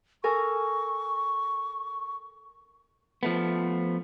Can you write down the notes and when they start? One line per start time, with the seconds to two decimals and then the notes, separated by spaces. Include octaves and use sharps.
0.24 A4 A#4 G#5 C#6
3.23 F3 A3 B3